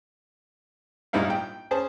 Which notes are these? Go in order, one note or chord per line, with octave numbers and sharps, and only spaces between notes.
A#1 G#2 G3 D#4 E4 F5
G5
C#4 G#4 C5 A5